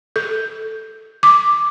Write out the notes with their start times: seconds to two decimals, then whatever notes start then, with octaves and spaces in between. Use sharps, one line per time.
0.16 A4
1.23 D6